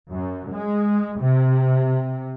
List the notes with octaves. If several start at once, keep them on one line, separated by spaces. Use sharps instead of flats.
F#2
G#3
C3